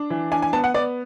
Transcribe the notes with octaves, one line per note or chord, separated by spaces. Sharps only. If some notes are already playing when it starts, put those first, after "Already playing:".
Already playing: D4
E3
D4 G#5
G#5
B3 A5
F#5
B3 D5